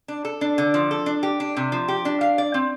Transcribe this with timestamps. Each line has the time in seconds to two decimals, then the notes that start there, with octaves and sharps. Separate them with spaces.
0.08 D4
0.25 A4
0.41 D4
0.58 D3
0.74 F3
0.91 A4
1.06 D4
1.23 G4
1.40 D4
1.57 C3
1.72 F3
1.88 G4
2.05 D4
2.21 F5
2.38 D5
2.54 C4